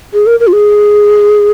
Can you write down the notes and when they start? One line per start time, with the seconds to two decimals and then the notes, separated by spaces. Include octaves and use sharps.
0.13 G#4
0.27 A#4
0.40 A#4
0.47 F4
0.53 G#4